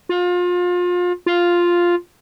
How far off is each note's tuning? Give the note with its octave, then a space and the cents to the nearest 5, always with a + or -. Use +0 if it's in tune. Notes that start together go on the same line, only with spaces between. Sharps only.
F4 +30
F4 +0